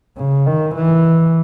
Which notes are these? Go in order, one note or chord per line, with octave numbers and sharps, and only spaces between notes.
C#3
D#3
E3